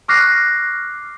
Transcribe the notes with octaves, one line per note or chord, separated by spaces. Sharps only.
C#6 D6 F6 F#6 A#6 C7